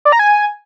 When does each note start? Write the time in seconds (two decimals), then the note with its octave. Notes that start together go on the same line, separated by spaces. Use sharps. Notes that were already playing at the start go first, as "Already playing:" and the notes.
0.05 D5
0.12 A#5
0.19 G#5